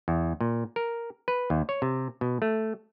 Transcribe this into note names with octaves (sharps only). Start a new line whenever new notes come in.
E2
A#2
A#4
B4
D#2
C#5
C3
B2
A3